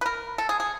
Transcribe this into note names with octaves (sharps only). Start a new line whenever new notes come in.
B4
A#4
A4
G#4
G#4